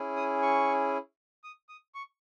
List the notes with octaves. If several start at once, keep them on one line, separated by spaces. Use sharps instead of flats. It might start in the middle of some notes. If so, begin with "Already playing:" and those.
Already playing: C#4 E4 G#4
D#6
C#6
D#6
D#6
C#6